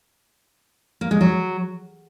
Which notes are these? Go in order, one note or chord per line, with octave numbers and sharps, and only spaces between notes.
A#3
G#3
F#3